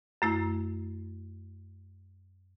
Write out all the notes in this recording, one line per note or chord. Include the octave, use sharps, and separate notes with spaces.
F#2 A3 E4